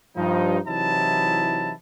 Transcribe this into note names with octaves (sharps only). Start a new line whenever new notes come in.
G2 F3 D#4
C3 E3 F#3 D#4 E4 A5